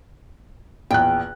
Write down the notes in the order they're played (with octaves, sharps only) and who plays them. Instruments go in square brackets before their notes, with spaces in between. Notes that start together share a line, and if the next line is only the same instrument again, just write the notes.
[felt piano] A#1 E2 F#6 [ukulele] G5